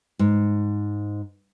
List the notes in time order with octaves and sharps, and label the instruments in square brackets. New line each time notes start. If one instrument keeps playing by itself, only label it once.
[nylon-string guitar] G#2